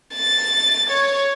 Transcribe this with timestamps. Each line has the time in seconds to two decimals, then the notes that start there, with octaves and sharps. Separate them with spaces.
0.15 A6
0.90 C#5